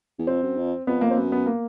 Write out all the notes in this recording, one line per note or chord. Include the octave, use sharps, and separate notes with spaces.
E2
F2 C4
F#2
F2
F2 B3
A#3
C4
F#2 B3
B3
A#3